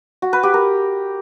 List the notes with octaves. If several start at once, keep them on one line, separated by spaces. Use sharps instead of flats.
F#4
B4
G4
A#4